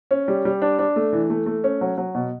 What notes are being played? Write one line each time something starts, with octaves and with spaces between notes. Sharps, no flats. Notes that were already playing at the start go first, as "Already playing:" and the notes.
C#4
G3
G3
D4
D4
A3
E3
A3
A3
C#4
F#3
F#3
B2